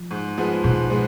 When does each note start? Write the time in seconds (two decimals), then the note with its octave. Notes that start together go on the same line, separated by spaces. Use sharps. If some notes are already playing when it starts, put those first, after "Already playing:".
Already playing: F3
0.11 G#2
0.38 F3 G#3 B3
0.64 G#2 B2
0.90 F3 G#3 B3